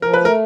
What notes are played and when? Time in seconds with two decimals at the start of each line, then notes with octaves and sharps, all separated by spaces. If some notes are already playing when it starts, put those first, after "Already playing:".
0.02 F3 A#4
0.14 B4
0.21 A3 A#4